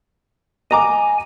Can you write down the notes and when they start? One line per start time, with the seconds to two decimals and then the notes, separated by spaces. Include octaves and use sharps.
0.71 D#5 G#5 A#5 D6